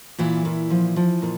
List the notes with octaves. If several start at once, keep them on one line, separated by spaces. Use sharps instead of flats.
A#2 E3 E4
A#2
F3
F3
A#2